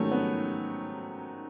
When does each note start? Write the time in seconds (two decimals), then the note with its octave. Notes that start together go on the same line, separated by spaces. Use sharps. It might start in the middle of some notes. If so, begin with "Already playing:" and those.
Already playing: G#2 D#3 F#3 A3 C#4
0.12 B3